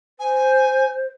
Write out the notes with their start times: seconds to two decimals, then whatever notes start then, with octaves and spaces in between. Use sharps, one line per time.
0.19 C5 G#5